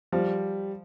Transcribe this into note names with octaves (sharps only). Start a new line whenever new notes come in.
F3 G3